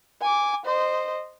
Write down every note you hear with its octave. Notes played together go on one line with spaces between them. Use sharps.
G#5 D6
C5 D#5